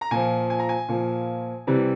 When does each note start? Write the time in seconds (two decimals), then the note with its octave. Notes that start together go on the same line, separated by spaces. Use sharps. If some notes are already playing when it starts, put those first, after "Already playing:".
0.01 A#5
0.11 A#2 F3 G#5
0.50 G#5
0.59 A#5
0.69 G#5
0.89 A#2 F3
1.67 C3 E3 G3